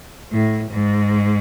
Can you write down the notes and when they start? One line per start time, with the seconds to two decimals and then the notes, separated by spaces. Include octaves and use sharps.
0.32 A2
0.71 G#2